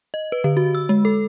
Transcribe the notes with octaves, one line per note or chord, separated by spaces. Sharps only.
D#5
B4
D3
F#4
E6
G#3
A4